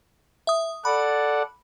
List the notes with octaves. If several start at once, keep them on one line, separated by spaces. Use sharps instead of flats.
E5 D#6
A4 D5 F#5 B5